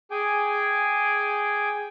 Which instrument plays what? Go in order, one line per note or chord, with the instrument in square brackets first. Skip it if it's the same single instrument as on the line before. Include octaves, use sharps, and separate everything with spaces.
[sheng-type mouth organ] G#4 G5 G#5 D6